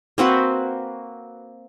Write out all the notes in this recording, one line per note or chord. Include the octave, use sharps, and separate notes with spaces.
A#3 C4 F#4 B4